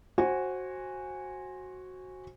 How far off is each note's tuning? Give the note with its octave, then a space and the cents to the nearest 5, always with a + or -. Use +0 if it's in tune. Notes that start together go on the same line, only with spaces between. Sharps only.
F#4 +0 C5 +25 G#5 -10